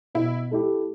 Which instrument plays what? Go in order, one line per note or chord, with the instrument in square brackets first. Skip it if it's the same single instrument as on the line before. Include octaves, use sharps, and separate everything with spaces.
[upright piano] B2 [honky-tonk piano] E4
[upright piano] A3 E4 G4